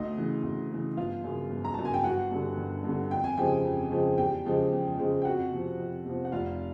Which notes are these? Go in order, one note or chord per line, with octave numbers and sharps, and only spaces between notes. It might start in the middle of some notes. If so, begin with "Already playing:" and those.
Already playing: D2 D#4 D#5
C#3 E3
D2
C#3 E3
G1 F4 F5
F#2 C#3
G1
A#5
F#2 C#3 A5
G#5
G5
G1 F#4 F#5
G2 D3
G1
G2
D3
F2 G5
G#5
C#3 F3 G#3 G4 G5
F2
C#3 F3 G#3
E2 G4 G5
C#3 F3 G#3
E2
C#3 F3 G#3
G5
F2 F#4 F#5
C3 F3
F2
C3 F3
F#5
F1 F4 F5